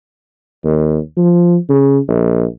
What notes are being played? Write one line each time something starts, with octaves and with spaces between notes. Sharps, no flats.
D#2
F3
C#3
A#1